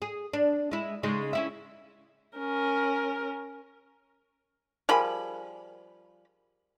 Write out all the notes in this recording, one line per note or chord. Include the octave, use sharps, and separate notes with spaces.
G#4
D4
G#3 E4
C#3 G#3 D#4
C#4 E4 E5
C#4 A#4
F3 G3 G#4 A#4 G#5 B5